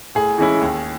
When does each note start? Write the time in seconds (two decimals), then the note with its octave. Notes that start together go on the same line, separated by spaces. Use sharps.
0.15 A2 G#4
0.38 E3 G#3 C#4 E4
0.61 D#2